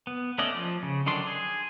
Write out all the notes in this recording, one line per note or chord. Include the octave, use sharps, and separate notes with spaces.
B3
A3 B3 C#4 D5 D#5
F3
C#3
D3 D#3 F#3 D4 C6
G#4